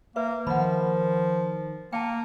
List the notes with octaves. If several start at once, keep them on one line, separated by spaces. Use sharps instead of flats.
A#3 B4 E5
D#3 F3 F#5 B5
A#3 G5 A5